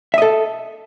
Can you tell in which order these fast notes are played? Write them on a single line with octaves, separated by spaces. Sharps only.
E5 D#5 A4